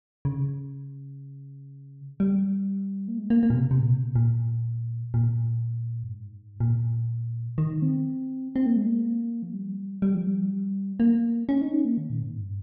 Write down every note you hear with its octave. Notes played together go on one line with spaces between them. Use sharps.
C#3
G3
A#3
G#3
A#3
A#3
A#2
C3
C3
A#2
C3
A#2
A#2
A#2
G2
G#2
A#2
D#3
C4
C4
A#3
G#3
A#3
F3
G3
G3
F3
G3
A#3
C#4
D#4
C#4
A#3
D#3
A#2
G#2
G2